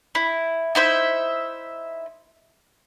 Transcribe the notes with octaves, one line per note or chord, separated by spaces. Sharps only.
E4
D#4 E4 C5 E5